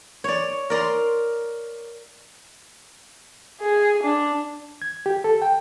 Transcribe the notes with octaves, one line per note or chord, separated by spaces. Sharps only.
C#5 D5
A#4 D5 A#5 C6
G#4
D4
G#6
G4
A4
G5